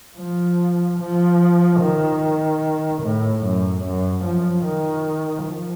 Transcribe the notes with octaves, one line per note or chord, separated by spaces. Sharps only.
F3
F3
D#3
A2
F#2
F#2
F3
D#3
F3